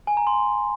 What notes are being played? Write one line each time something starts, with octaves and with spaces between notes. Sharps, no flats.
G#5
A#5
C6